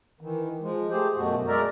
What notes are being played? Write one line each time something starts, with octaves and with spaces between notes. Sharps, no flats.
D#3 E3
F3 G#3
A3 G4 G#4 C5
F#2 B2 A3 F#4
G#3 A#4 D5 E5 A#5